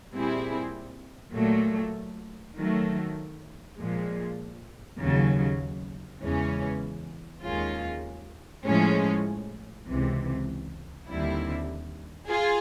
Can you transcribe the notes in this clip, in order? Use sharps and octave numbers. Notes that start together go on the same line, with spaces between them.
A#2 G3 C4 E4 G#4
A#2 F#3 A3
D#3 F#3 A3
A#2 F3 G#3
D#2 C#3 F#3
E2 C#3 E3 G#3 C#4
D#2 D#3 G#3 C#4 F4
A2 F3 G#3 C#4
C#2 C3 E3
D#2 D3 G3 C4 E4
F4 G#4